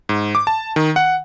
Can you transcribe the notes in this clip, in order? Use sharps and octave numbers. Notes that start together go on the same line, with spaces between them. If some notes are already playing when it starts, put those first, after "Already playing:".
G#2
D6
A5
D#3
F#5